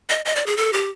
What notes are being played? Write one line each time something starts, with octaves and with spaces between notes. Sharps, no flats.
D#5
D#5
D5
G#4
A4
G4